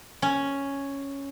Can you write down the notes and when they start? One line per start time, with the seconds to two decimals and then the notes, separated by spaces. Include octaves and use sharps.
0.22 C#4